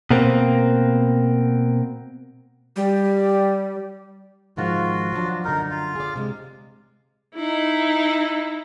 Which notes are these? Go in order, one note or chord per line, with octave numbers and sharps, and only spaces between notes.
B2 A#3 C4
G3
G#2 D#3 F3 F4 F#4
F3 F#3 D4
F#2 D3 D#4 A#4
F4 F5
G#4 D5
C3 G#3
D#4 E4